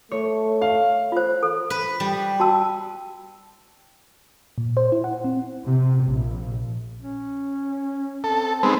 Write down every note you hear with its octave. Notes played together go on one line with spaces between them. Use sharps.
A3 C#5
F5
F4 C5
A4
B4
G3
F#4 A5 E6
A#2
C5
E4
F#5
C4
C3
A#1
C#4
C4 A4
G#3 B3 C4 D#4